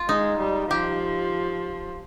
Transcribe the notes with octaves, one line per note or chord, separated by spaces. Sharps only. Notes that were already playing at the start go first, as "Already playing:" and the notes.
Already playing: F4
G#3 D#4
G3
F3 G4